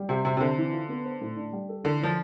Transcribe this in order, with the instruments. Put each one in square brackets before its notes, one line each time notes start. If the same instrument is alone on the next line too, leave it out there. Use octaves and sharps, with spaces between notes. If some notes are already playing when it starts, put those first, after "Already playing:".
Already playing: [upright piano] G3
[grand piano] C3 [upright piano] G4
[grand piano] C3 [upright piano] C4
[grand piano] C3
[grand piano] D3 [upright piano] C5
[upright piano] E3
F4
B3
C5
A2
D4
G3
A4
[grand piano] D3 [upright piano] E3
[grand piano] F3 [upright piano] D4